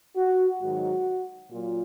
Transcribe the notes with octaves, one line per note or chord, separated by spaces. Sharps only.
F#4
G#2 D#3 F#3 F#4
A#2 F#3 F4